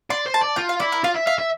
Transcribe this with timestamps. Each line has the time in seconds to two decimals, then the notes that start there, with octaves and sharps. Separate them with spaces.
0.10 D5 C6
0.26 C5
0.34 A5
0.41 D5
0.56 F4 G5
0.69 F5
0.80 E4 D5
0.92 A#4
1.04 F4 F5
1.15 E5
1.27 E5 F5
1.39 E5